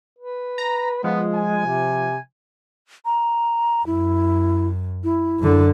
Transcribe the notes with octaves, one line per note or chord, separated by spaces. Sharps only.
B4
A#5
F3 G#3 B3
G#5
C3
A#5
F#2 E4
E4
F#2 D3